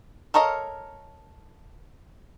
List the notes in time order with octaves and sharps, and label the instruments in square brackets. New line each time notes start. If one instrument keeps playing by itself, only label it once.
[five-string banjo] A4 A#4 C#5 D#5 F5